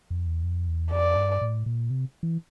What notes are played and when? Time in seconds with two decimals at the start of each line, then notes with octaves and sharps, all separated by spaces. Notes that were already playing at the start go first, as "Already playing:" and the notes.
0.10 F2
0.27 E2
0.43 F2
0.68 E2
0.91 F2 D5
1.16 G2
1.41 A2
1.66 A#2
1.90 C3
2.23 E3